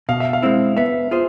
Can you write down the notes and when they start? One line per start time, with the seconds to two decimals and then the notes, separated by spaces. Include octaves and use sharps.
0.09 B2 F5
0.20 E5
0.33 F5
0.42 G#3 C4 E4
0.77 B3 E5
1.11 F4 G#4 C5